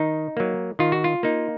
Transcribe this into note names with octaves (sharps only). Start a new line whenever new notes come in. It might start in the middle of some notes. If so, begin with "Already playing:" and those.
Already playing: D#3 D#4
F#3 A#3
D#3 F4
F#4
F4
A#3 D#4